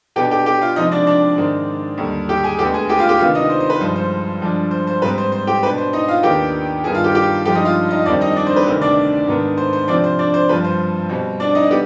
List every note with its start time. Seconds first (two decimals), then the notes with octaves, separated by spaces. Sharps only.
0.16 B2 B3 D4 G4 G5
0.31 G4 G5
0.46 G4 G5
0.62 F4 F5
0.76 C3 F3 G#3 C4 D#4 D#5
0.92 D4 D5
1.07 D4 D5
1.37 G#2 D#3 G#3 C4
1.98 D#2 D3 G3
2.29 G4 G5
2.44 G#4 G#5
2.59 D2 D3 G#3 B3 G4 G5
2.74 G#4 G#5
2.89 G4 G5
2.99 F4 F5
3.09 G4 G5
3.19 C3 D#3 B3 D4 F4 F5
3.35 D#4 D#5
3.50 C5
3.60 C5
3.70 B4
3.80 G2 F3 G#3 C5
3.96 C5
4.41 G2 F3 G#3 D4
4.71 C5
4.87 C5
5.02 G#2 G3 C4 B4
5.18 C5
5.32 C5
5.47 G4 G5
5.63 B2 B3 D4 B4
5.78 C5
5.93 D#4 D#5
6.08 F4 F5
6.23 D#2 D#3 B3 D4 G4 G5
6.84 G2 D#3 B3 D4 G#4 G#5
6.95 F4 F5
7.04 G4 G5
7.15 G4 G5
7.45 G2 F3 G#3 D4 G4 G5
7.55 D#4 D#5
7.65 F4 F5
7.91 D#4 D#5
8.06 F2 D#3 G3 C4 D4 D5
8.21 D#4 D#5
8.36 D4 D5
8.47 C5
8.56 B4
8.66 D2 C3 D#3 B3 C5
8.82 D4 D5
9.27 G#2 D#3 B3 D4
9.58 C5
9.73 C5
9.88 C3 F3 C4 D4 D5
10.04 C5
10.19 D4 D5
10.34 C5
10.49 G2 F3 C4 B4
10.64 C5
11.09 B2 G3 C4
11.40 D4 D5
11.55 D#4 D#5
11.71 G3 B3 G4